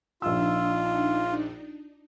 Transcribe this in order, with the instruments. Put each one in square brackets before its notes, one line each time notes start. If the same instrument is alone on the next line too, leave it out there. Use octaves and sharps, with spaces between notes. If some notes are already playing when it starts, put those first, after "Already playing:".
[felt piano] A#1 E6 [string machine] D4 D#4 [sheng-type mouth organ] F4